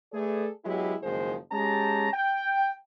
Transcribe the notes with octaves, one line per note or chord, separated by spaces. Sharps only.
A3 G#4 A4 B4 D5
F#3 G#3 B3 E4 G4
F#1 D#3 F3 G#3 C5
G#3 C#4 G4 A5 A#5
G5